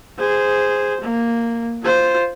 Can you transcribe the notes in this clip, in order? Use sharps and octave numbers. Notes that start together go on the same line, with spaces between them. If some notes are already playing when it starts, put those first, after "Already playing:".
G#4 C5
A#3
F4 C5